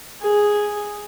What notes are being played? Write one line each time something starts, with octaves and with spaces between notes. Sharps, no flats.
G#4